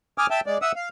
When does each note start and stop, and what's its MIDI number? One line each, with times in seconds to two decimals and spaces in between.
0.18 0.27 80
0.18 0.27 86
0.18 0.27 87
0.18 0.27 89
0.30 0.41 76
0.30 0.41 79
0.30 0.41 81
0.46 0.58 56
0.46 0.58 74
0.62 0.72 76
0.62 0.72 78
0.62 0.72 87
0.62 0.72 88
0.76 0.89 77